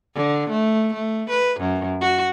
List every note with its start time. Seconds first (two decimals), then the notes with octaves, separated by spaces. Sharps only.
0.15 D3
0.49 A3
0.94 A3
1.30 B4
1.60 F#2
2.01 F#4